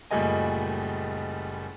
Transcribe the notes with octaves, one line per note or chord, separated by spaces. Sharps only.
F#1 A#2 G3 A3 D#5 G#5